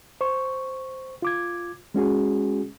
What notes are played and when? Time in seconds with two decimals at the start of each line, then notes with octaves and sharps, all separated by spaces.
0.21 C5 C#6
1.22 F4 D6 G#6
1.94 G#3 C#4 F#4 G#4